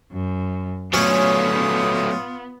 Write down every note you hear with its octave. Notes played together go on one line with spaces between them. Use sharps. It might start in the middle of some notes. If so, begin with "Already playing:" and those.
F#2
F#3 A3 B3 C#4 F4 D#6